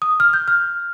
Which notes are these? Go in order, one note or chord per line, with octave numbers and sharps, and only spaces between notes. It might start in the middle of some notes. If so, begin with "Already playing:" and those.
D#6
F6
G6
F6